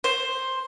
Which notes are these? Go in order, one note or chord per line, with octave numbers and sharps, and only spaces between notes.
C5